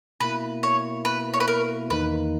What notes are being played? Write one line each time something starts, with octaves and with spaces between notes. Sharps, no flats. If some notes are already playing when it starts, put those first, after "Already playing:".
B2 A#3 E4 B4
C#5
B4
C#5
B4
A#4
E2 D#3 A#3 D#4 B4